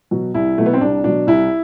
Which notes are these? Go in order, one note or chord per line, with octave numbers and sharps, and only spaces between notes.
B2 F#3
C2 E4
B2 F#3 A3
B3
C4
C2 D4
B2 F#3 D4
C2 E4